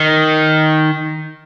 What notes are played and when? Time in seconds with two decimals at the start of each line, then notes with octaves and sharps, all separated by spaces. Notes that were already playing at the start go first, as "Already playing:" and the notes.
Already playing: D#3